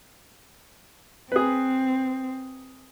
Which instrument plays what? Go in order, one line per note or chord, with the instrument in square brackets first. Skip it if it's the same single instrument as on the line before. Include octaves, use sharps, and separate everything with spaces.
[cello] C4 [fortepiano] G#4 B4